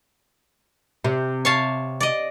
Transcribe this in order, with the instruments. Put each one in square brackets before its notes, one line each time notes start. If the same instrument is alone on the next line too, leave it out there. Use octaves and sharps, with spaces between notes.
[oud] C3
[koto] C#5 F5 A5
D5 D#5